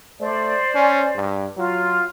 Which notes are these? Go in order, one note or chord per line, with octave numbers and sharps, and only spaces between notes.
A3 C5 D5
C#4
G2
F#3 F4